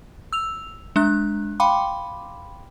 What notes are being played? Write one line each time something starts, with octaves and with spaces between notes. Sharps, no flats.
E6 F7
G#3 D4 F#6
F5 G5 B5 C6 D6